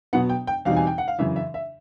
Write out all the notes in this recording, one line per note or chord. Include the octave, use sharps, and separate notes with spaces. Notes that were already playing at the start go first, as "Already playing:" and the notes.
B2 F#3 B3 F#5
G5
G5
E2 B2 G3 C4 D#4 F5
G#5
G5
F#5
F5
F#2 C#3 E3 E5
E5
E5